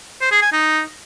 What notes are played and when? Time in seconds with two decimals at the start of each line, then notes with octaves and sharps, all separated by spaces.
0.21 C5
0.31 G#4
0.42 G#5
0.52 D#4